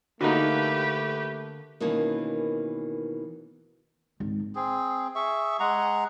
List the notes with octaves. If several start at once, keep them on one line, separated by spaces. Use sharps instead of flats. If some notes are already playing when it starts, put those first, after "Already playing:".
D3 A3 A#3 D#4 F#4 G4 B4
B2 D#3 E3 A#3 C#4
G#1
C4 G#4
G#4 E5 C#6
G#3 G#4 F#5 A#5